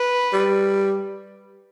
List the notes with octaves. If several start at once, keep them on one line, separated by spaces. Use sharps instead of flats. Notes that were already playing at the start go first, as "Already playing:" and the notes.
Already playing: B4
G3